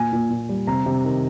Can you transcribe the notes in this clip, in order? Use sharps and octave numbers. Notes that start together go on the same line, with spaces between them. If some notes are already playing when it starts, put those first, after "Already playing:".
Already playing: A#2 G#5
A#2
A#2
G3
C3 A#5
C3
D#3